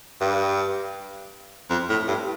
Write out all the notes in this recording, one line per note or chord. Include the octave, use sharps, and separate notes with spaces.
G2
F2
A2
G2